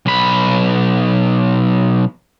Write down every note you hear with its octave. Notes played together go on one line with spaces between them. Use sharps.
B1 B5